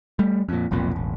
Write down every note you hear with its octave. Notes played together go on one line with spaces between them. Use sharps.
G3 A3
F2 A#2
F1 B1 F2 A#2
E1 A1